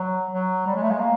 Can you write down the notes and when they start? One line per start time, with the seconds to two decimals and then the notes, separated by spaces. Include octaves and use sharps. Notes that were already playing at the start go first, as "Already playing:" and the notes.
Already playing: F#3
0.34 F#3
0.67 G3
0.76 G#3
0.83 A3
0.91 G#3
0.98 A#3